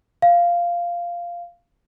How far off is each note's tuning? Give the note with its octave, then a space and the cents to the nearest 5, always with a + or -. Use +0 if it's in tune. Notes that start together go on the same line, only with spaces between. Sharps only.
F5 -5